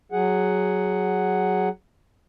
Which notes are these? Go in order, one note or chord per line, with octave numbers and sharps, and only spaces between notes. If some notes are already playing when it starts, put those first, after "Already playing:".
F#3 G#4 F#5